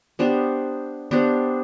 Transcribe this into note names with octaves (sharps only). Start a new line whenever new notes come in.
B3 D4 G4 C5
B3 D4 G4 C5